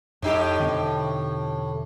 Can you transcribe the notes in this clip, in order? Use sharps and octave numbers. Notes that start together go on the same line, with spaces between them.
F2 A2 D#4 G4
E1 D3 C4